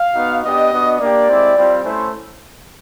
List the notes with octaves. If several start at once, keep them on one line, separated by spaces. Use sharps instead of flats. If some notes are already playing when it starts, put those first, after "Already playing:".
Already playing: F5
B3 D#4 F#4
B3 D4 G4 D#5
B3 D4 F#4
A#3 D4 G4 D5
G#3 C4 E4 G4
G3 C4 F4
A3 C#4 E4 C5